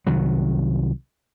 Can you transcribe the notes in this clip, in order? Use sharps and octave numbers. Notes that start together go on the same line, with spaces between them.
C2 D#3 F#3